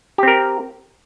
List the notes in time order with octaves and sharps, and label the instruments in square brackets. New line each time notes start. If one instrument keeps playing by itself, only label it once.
[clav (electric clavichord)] G4
C4
A#4